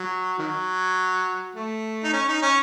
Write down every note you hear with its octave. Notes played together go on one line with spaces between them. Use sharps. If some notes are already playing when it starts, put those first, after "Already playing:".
Already playing: F#3
D#3 F#3
A3
D#4
C#4
D#4
C#4